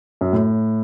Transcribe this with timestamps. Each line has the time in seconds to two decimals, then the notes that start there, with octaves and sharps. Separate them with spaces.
0.21 F#2
0.33 A2